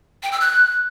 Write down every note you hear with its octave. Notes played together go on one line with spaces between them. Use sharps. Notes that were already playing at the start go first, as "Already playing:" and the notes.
G5
E6
F#6